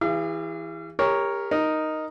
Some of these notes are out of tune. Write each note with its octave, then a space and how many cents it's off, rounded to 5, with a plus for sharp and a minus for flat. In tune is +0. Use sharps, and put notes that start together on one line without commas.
E3 +0 G#4 -45 F5 -40
G4 +35 A#4 +0 C#5 +0
D#4 +0 A#4 +0